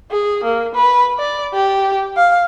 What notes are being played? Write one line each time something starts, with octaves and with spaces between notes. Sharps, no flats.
G#4
A#3
B4
D5
G4
F5